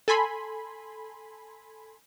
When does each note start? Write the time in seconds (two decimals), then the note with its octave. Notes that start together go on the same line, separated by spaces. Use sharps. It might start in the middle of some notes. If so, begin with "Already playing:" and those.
0.08 A4 G#5 B5 C6